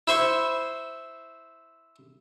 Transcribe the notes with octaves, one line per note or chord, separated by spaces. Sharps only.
E4 C5 C#6